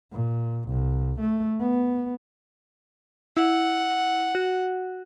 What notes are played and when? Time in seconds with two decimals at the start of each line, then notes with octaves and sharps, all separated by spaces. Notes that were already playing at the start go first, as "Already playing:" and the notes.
0.12 A#2
0.69 C2
1.20 A3
1.60 B3
3.37 E4 F#5
4.35 F#4